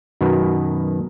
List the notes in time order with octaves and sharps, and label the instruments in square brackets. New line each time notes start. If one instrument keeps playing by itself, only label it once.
[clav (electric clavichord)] F#2 B2 D#3 B3